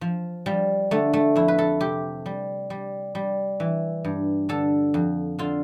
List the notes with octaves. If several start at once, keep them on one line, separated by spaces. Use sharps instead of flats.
F3
F3 G3
D3 A3
A3
F2 E4
B4
A4
C3 G4
G3
G3
G3
E3
G2
D3 A4
F2
D3 F4